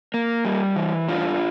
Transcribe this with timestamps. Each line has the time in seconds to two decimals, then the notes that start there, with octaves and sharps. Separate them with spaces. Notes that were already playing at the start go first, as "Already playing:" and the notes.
0.14 A#3
0.45 G3
0.76 E3
1.08 G2 D4 F4